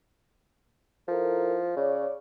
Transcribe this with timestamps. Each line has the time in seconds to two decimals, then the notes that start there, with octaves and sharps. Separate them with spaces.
1.08 F3 E4 A4 A#4
1.76 C#3 C#5 D5